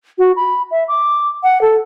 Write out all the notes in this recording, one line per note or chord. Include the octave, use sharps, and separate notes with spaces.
F#4
B5
E5
D6
F#5
A4